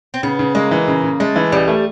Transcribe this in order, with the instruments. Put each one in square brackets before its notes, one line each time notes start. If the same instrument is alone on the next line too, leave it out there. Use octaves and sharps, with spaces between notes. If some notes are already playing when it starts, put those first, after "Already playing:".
[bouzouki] C4
[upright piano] C#3 [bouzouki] B3
[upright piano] C#3
[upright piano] G#3 [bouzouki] A#3
[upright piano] E3
C#3
C#3
[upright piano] G#3 [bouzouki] A3
[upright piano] E3
[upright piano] C#2 [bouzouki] G3
[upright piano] A3